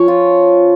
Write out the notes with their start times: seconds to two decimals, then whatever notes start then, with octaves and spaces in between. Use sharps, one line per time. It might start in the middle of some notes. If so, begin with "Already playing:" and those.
Already playing: F3 C#4 C#5
0.08 F4